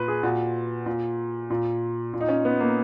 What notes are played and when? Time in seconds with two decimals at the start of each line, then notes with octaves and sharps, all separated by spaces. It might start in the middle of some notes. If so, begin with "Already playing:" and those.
Already playing: A#2 B4
0.08 G#4
0.23 A#2 F#4
0.86 A#2
1.50 A#2
2.13 A#2
2.21 D#4
2.29 C#4
2.45 B3
2.60 A#3